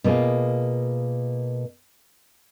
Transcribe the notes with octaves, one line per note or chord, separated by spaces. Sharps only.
B2 A#3 F4 G#4 F5